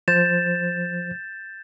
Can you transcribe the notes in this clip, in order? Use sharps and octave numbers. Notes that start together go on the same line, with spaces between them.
F3 C5 G6 A6 E7